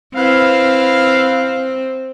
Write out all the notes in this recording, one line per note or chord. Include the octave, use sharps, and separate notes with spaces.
C4 E4 B4 F5